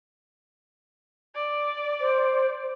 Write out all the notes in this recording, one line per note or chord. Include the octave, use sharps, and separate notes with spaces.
D5
C5